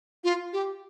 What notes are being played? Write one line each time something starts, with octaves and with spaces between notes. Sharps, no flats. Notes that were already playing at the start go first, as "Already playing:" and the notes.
F4
G4